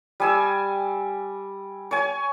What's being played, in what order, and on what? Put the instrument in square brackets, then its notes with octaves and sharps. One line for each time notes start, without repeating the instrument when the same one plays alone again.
[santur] G3 G#5 E6
C#5 G#5